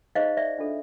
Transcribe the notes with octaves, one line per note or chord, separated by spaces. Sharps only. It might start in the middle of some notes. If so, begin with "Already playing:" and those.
D#4 G#4 C5 D#5 F5
D5 E5
D4 F4 A4